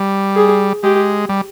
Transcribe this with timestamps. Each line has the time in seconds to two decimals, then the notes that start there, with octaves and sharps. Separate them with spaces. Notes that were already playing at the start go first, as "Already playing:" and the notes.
Already playing: G3
0.36 G#4
0.83 G#3 G4
1.29 G3